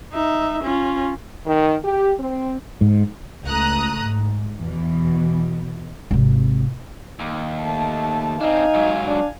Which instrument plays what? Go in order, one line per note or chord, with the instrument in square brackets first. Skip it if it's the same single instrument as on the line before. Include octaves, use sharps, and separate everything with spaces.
[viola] D#4 E5
C#4 F4
[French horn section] D#3
G4
C4
[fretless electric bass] G#2
[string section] C#2 A3 A#5 D#6 F#6
G#2
E2 B2 E3
[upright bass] G#1 C3
[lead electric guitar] D#2
[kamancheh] A3 A5
[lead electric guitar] C4 D4 [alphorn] D#4 [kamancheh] F5 G#5
[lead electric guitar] G#2 F#3
[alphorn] D4